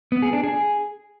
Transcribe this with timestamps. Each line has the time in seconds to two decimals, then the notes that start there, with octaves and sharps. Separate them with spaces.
0.12 B3
0.22 G#4
0.33 D4
0.44 G#4